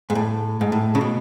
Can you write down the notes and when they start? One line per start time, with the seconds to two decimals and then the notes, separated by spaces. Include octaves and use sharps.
0.10 G#2
0.15 A2
0.61 G#2
0.72 A2
0.95 C#3
1.01 B2